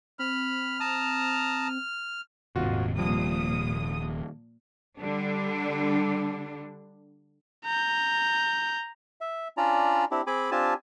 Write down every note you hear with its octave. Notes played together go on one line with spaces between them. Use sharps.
C4 B5 F6
A5 A#5 D#6
D#1 D#2 G#2 C3 F4 F#4
A#2 F3 G3 D#6
D3 G3 D4
A#5 G6
E5
C#4 D4 F4 D5 A#5
C4 D4 E4 G4
C4 G#4 G#5 B5 D6
C4 D4 F4 G4 G#5 A5